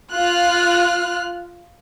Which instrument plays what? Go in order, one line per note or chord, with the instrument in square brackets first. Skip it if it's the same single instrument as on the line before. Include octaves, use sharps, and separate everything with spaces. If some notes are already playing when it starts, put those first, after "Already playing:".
[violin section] F4 F6 F#6